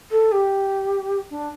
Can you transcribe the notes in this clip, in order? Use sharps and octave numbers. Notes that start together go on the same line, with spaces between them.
A4
G4
D4